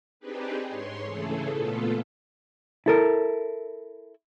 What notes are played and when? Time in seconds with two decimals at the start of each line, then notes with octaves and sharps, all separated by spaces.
0.20 C4 D4 D#4 G4 G#4 B4
0.66 G#2 C#5 C6
1.03 C#3 E3 A3 G#4 A4
1.52 A#2 A3 B3 F4 A4
2.86 E4 A4 A#4